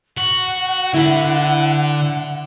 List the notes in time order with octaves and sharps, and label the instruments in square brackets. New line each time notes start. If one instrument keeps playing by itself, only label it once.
[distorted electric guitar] F#4 [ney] F#5
[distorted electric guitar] D3 [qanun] E4 B5